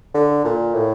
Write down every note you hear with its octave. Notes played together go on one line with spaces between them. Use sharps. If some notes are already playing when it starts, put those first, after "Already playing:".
D3
A#2
A2